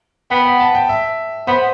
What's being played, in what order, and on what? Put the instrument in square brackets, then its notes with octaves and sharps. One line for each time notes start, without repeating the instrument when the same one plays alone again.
[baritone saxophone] B3 [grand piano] G5
[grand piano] G5
A5
G5
E5
[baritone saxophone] B3 [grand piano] C5